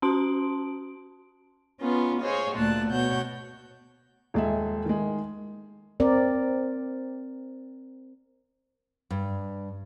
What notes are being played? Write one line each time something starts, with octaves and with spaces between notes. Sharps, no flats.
C#4 F#4 A5 C6 D7
B3 C#4 D#4 F4
G#4 C5 C#5 D#5 F5
D2 A#2 A3 D4 A5 F#6
B2 C#5 F#5 G6
D#1 G#3 E5
D#3 G#3
C4 A#4 D5
G2